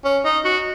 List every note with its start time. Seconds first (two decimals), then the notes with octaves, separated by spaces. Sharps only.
0.04 C#4
0.25 D#4
0.44 F#4